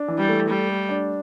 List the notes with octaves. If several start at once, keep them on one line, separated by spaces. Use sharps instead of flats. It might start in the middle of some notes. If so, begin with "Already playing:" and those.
Already playing: D4
E3
G3
A3
G3 A3
A3
D4